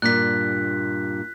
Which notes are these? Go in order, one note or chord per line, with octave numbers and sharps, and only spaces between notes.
G2 A#2 F#6 B6